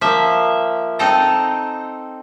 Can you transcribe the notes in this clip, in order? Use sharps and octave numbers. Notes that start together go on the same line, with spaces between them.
F3 A#3 E5
C4 D#4 A4 D#5 G5 A#5